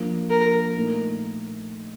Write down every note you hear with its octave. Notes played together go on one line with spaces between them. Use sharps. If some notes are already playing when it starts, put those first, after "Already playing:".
Already playing: F3 A#3 D4 F4
A#4
A#2 A3 D#4